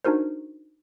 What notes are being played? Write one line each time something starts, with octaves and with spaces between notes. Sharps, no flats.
D4 D#4 F#4 A#4 C5